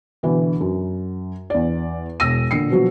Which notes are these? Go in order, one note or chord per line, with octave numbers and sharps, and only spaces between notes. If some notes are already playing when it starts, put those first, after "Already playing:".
B2 D3 E3
F#2
E2 D5
E1 E6 A#6 D#7
A#2 D3 C7 C#7
B2 F3 F#3